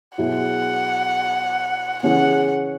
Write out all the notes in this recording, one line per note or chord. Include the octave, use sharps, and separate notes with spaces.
B2 F#3 E4 G#4 F#5
C#3 E3 C#4 G#4 F#5